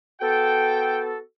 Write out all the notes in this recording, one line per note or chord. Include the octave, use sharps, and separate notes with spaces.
B3 F#4 A4 G5